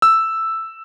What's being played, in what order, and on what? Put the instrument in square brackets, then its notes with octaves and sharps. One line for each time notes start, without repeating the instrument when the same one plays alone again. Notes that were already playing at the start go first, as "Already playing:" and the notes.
[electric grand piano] E6